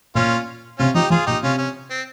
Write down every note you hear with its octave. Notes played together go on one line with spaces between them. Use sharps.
A#2 C#4 F4
C3 C#4 F4
F3 D#4 G4
F3 F4 G#4
A#2 D#4 G4
C3 C#4 F4
C#4
C4